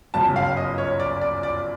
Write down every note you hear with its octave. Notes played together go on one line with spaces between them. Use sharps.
G1 F#2 C#3 A5
F5
D#5
C#5
D5
D5
D5